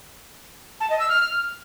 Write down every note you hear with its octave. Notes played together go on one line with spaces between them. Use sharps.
A5
D#5
E6
F6